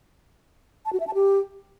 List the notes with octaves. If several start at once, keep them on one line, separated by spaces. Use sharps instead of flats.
A5
F#4
E5
A5
G4